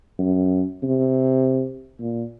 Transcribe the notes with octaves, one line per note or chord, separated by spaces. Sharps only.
F#2
C3
A#2